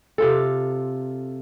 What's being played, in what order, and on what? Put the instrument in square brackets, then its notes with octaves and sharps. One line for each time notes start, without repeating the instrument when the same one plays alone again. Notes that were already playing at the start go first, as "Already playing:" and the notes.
[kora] C3 F4 A4